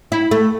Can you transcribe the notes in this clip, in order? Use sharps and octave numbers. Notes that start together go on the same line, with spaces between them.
E4
A3